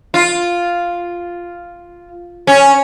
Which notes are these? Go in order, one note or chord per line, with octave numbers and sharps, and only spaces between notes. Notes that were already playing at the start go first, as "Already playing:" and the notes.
F4
C#4